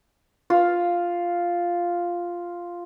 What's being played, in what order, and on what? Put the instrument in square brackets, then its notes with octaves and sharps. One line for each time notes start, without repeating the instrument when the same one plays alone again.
[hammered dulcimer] F4 F5